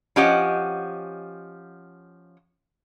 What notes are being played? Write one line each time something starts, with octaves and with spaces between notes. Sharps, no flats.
F3 C#4 G4 D#5 F#5